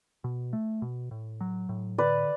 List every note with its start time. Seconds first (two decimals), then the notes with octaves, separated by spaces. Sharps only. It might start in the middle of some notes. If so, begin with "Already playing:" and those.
0.24 B2
0.53 A3
0.82 B2
1.11 A2
1.41 F#3
1.69 A2
1.98 D3 B4 D5